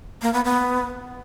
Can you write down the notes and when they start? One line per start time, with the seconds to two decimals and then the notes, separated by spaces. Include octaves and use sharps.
0.22 A#3
0.33 B3
0.45 B3